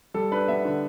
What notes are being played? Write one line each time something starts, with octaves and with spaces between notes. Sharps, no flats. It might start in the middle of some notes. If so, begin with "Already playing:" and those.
G3 A4
D4 B4
B3 E5
D3